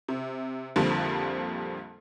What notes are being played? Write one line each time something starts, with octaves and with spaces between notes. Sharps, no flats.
C3
A#1 F2 D3 F3 G3 A#3